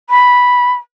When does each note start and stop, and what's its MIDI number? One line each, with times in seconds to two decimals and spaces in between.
0.10 0.72 83